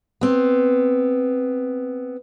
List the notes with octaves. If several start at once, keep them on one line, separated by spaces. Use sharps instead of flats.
B3 C4